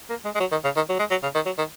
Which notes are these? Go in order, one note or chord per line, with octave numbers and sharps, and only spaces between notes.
A#3
G#3
G#3
F#3
D#3
C#3
D#3
F#3
G#3
F#3
C#3
D#3
F#3
D#3